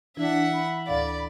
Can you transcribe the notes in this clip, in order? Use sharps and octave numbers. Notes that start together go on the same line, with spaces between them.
E3 D4 E4 E5 F#5
B5
D2 A2 D5 F5